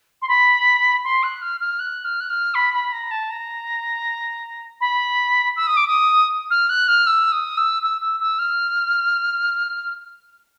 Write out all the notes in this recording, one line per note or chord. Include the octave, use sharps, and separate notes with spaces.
C6
B5
C6
F#6
F6
F6
F#6
F6
F#6
F6
B5
B5
A#5
A5
A#5
B5
E6
D#6
D6
D#6
F6
F#6
F6
E6
D#6
E6
E6
E6
E6
F6